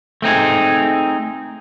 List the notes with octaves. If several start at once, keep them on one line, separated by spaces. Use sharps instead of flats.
A3 C4 D#4 G#4